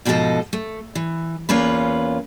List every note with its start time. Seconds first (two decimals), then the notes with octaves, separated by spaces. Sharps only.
0.05 G#2 B2 F3 F#4 A4 D#5
0.53 A3
0.95 E3
1.49 E2 A#3 C#4 F4 B4